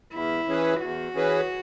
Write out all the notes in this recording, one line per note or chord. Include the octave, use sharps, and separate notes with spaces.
E2 E4
E3 C#4 G#4 B4
E2 F#4
E3 C#4 G#4 B4